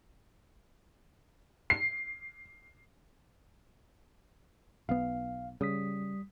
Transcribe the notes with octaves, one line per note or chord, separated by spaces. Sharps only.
C7
B1 B3 F5
C#3 G3 D#6 B6